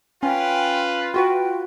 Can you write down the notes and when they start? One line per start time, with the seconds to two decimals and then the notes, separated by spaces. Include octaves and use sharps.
0.23 C#4 F4 B4 G5
1.14 F4 F#4 B4 G5